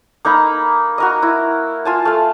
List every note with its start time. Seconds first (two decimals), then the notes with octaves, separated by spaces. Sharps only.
0.25 A#3 D#4 A#5 B5
0.98 F#4 A#4 D#5
1.22 E4
1.85 F4 G#5 A5
2.05 A3 F5